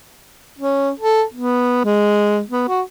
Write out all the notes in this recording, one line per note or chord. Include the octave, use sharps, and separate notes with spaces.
C#4
A4
B3
G#3
B3
F#4